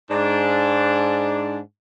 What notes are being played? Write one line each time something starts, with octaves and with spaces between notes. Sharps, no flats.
G#2 D4